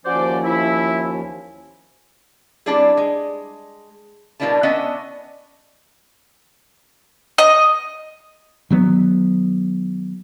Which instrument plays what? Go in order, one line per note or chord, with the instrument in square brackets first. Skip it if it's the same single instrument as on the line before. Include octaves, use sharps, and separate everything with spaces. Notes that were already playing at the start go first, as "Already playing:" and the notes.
[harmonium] D#2 F3 C#4 [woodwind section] F#4 C5 D5
[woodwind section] E4
[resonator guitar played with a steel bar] G3 C4 D4 E4 G#4
G#3
B2 G3 A#3 D4 E4 A5
B3 C#4 D4 D#5 E5
[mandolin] D#5
[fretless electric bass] D#3 F#3 B3